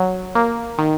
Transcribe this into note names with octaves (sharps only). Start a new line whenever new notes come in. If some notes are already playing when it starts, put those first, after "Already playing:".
Already playing: F#3
A#3
D#3